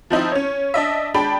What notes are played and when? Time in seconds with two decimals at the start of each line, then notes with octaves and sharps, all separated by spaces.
0.10 F3 C4 D#4 E4
0.32 C#4 C#5
0.74 D4 D#5 E5
1.14 G#3 D4 G5 B5